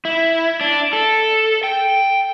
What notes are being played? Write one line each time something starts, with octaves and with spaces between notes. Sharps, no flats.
E4
D4
A4
G5